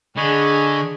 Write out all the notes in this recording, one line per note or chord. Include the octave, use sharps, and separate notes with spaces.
D3 D4 G#4 D#5 G#5 B5 C#6